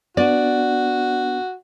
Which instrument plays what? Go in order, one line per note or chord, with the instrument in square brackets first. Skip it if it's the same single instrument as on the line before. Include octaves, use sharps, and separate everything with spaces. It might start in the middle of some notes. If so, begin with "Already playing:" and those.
[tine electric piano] B3 D4 [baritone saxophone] F#4 [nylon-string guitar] D5